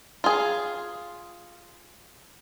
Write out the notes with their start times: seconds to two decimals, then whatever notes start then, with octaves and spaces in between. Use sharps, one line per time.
0.24 F4 G#4